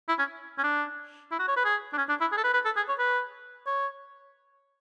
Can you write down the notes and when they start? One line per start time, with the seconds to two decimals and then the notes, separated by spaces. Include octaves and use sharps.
0.09 E4
0.19 C#4
0.58 C#4
0.63 D4
1.31 E4
1.39 F#4
1.48 C#5
1.57 B4
1.65 G#4
1.93 D4
1.98 C#4
2.09 D4
2.21 E4
2.32 G#4
2.37 A4
2.44 B4
2.54 B4
2.65 A4
2.77 G#4
2.89 C#5
2.99 B4
3.67 C#5